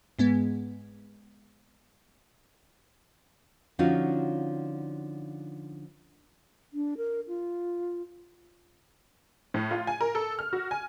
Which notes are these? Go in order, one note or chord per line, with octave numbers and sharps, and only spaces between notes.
G#2 G#3 B3
D3 F3 C#4 D#4 F4 F#4
D4
A#4
F4
A2
F4
G#5
A#4
A4
F6
F#4
G#5